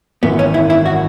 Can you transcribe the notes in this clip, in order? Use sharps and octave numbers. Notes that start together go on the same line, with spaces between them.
G#1 F#2 E3 B3
C#4
E4
E4
F#4